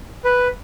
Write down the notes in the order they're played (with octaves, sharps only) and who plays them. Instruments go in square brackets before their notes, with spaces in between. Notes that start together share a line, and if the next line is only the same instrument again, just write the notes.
[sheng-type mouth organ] B4